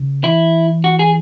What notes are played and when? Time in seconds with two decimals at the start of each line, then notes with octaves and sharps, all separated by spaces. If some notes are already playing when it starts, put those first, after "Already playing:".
Already playing: C#3
0.24 E3 E4
0.84 F#4
0.99 G#4